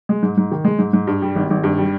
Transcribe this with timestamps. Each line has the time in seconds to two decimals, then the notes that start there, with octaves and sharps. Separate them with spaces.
0.09 G#3
0.23 G#2
0.37 G#2
0.52 D#3
0.65 G#3
0.79 G#2
0.93 G#2
1.07 G2
1.22 G3
1.36 G#1
1.50 G#1
1.64 G2
1.78 G3